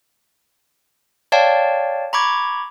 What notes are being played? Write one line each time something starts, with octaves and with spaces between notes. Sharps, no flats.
C#5 D5 F5 G5 A5
A#5 B5 C#6 D6 G#6